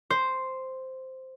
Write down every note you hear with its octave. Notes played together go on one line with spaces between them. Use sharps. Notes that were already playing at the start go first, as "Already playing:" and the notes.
C5